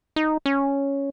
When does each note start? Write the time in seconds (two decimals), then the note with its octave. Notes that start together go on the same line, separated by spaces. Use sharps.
0.16 D#4
0.46 C#4